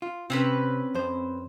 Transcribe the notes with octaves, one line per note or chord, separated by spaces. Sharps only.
F4
C3 C4 C#4 B4
F2 C5